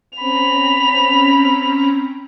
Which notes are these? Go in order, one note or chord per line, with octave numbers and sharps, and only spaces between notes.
C4 C#4 A#5 B5 F7